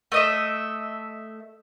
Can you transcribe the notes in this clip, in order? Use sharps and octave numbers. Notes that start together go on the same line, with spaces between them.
A3 D#5 E5